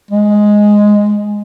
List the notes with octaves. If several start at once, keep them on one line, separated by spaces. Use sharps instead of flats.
G#3